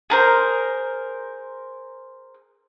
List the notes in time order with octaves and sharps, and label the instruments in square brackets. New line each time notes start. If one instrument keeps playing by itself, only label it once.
[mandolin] G#4 A#4 C5